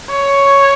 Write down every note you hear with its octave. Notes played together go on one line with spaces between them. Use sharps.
C#5